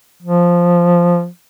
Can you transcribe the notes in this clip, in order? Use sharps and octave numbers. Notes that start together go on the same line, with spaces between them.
F3